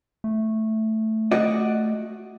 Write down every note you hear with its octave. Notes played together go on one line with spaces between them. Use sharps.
A3
F#4 D5 D#5